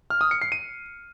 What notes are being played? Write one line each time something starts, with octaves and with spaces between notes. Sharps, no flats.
F6
D#6
C#7
C7
D#7